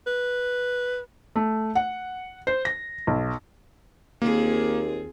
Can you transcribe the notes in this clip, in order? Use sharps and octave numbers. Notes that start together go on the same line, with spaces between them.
B4
A3
F#5
C5
A#6
B1
D#2 A#3 C4 F4 G#4